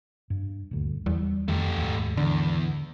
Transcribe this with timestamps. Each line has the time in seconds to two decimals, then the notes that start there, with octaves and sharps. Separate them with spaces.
0.30 G2
0.71 D#1 D2
1.06 E2 G3
1.48 F2 D#3 A3 G4
1.76 D#2 G#2
2.17 E2 D3